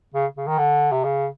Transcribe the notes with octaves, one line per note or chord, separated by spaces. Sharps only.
C#3
C#3
D#3
D3
C3
C#3